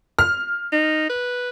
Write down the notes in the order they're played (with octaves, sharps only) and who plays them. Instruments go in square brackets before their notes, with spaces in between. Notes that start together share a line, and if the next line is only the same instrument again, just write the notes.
[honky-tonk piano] F6
[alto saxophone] D#4
B4